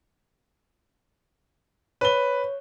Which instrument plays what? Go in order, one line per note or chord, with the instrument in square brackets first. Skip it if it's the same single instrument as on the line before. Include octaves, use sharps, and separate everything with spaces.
[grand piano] B4 G7 [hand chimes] C#5